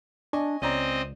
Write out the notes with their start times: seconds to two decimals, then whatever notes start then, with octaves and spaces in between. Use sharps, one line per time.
0.33 D4 D#5 G#5 C#6
0.62 C#2 C4 C#4 D5 D#5 A#5